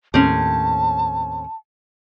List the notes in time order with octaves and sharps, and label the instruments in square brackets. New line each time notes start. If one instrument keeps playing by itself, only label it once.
[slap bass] D#2 A2 [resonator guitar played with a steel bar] C4 C#4 [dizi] A5